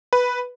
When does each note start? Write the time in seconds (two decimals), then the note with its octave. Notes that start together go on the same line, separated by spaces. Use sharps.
0.13 B4